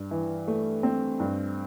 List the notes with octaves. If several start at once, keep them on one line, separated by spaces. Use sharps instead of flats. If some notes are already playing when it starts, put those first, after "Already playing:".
Already playing: G2
E3
A3
C4
G2